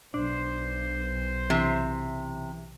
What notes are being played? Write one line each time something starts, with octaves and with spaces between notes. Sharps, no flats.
B1 D4 C5
C3 E3